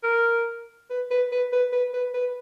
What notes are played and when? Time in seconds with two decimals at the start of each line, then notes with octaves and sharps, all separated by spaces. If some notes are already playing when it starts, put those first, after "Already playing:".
0.03 A#4
0.90 B4
1.11 B4
1.32 B4
1.52 B4
1.72 B4
1.93 B4
2.14 B4